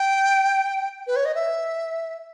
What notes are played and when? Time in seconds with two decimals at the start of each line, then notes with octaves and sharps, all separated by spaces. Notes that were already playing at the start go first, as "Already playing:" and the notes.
Already playing: G5
1.07 B4
1.16 C#5
1.25 D#5
1.35 E5